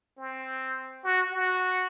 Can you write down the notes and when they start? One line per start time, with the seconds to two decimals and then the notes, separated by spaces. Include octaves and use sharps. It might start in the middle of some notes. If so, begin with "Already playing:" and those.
0.18 C4
1.04 F#4
1.32 F#4